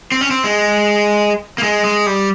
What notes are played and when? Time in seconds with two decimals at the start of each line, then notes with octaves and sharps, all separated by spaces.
0.12 C4
0.21 C#4
0.31 C4
0.44 G#3
1.58 A#3
1.63 G#3
1.85 G#3
2.06 G3